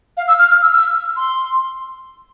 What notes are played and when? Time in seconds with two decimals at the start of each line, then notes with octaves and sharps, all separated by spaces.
0.17 F5
0.28 E6
0.39 F6
0.50 F6
0.62 E6
0.72 E6
1.16 C6